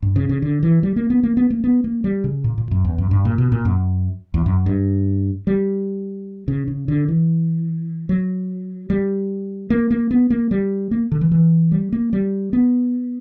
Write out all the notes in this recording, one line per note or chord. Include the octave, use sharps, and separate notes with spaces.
G2
C#3
C#3
D3
E3
G3
A#3
B3
A#3
B3
A#3
B3
A#3
G3
C#3
A#2
A#2
F#2
E2
F#2
G2
A#2
B2
A#2
F#2
E2
F#2
G2
G3
C#3
C#3
D3
E3
F#3
G3
A#3
A#3
B3
A#3
G3
A#3
D3
E3
E3
G3
A#3
G3
B3